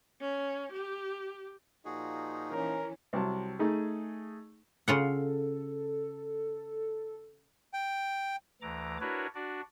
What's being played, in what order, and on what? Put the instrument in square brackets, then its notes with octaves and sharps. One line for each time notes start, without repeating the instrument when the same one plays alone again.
[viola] C#4
G4
[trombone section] A#2 F3 D#4 [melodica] F#4 G#4
[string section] E3 C#4 [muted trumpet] A#4
[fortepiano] C2 F#3 A5
A3 D#4 G#4
[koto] C#3 F4 F#5 [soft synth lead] A4
[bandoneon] G5
[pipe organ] D2 E3 A#5 D6
D4 E4 F#4 A#4 B4 C#5
D4 F#4 D5